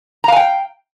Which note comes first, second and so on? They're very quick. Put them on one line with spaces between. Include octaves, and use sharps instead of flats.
A#5 F5 G#5 G5